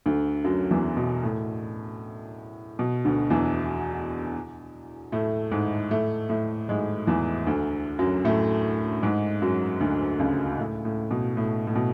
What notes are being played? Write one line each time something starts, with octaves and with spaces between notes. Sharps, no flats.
D2 D3
F#2 F#3
E2 E3
B2
A2
B2
D2 D3
E2 E3
A2 A3
G#2 G#3
A2 A3
A2 A3
G#2 G#3
E2 E3
D2 D3
F#2 F#3
A2 A3
G#2 G#3
F#2 F#3
D2 D3
C#2 C#3
A2
A2
B2
A2
A2
B2